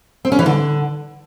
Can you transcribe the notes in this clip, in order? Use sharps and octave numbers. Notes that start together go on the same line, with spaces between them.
C4
C#4
E3
D3